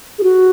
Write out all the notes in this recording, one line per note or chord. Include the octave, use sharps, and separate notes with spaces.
G#4
F#4